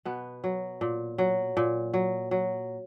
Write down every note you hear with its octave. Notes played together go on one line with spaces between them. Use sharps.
B2 B3
F#3
A#2
F#3
A#2
F#3
F#3